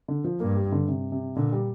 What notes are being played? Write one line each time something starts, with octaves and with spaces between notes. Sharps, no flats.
D3
F3
G2 A#3
G3
D3
C3
C3
A#2 D3
G3